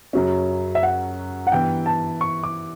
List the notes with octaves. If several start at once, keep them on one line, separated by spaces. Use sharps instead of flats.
F#2 C#3 F#3 C#4
E5
F#5
F#5
G2 E3 B3 E4 G5
A5
C#6
D6